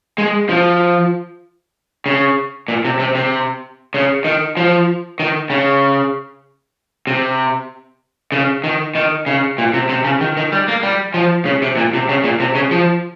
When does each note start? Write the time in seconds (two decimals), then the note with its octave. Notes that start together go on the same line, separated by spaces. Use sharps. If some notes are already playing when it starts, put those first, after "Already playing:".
0.18 G#3
0.49 F3
2.06 C#3
2.68 A#2
2.85 C3
2.99 C3
3.15 C3
3.94 C#3
4.25 D#3
4.57 F3
5.20 D#3
5.50 C#3
7.07 C3
8.32 C#3
8.64 D#3
8.95 D#3
9.26 C#3
9.58 A#2
9.74 C3
9.89 C3
10.04 C#3
10.21 D#3
10.37 D#3
10.52 G3
10.68 A#3
10.83 G3
11.14 F3
11.45 C#3
11.62 C3
11.77 A#2
11.94 C3
12.09 C#3
12.24 A#2
12.40 C3
12.55 C#3
12.71 F3